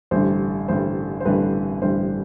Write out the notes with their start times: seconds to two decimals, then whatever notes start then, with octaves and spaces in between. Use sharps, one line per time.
0.11 A1 G2 D3 G3 C5
0.68 A1 G2 D3 G3 C5
1.21 C5
1.25 A1 G2 D3 G3 B4
1.82 A1 G2 D3 G3 C5